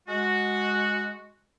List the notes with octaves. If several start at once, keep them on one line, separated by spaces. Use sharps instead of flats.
G#3 F#4